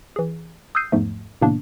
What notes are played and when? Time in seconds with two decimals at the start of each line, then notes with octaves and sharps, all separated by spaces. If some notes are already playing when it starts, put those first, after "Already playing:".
0.16 E3 G#4
0.75 D#6 E6 F#6 G6 C7 D#7
0.92 E2 G#2 F3 A3
1.41 A2 C3 D#3 A#3 B3 D4